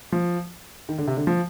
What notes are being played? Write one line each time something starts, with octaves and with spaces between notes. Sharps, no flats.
F3
D#3
D3
C3
D3
F3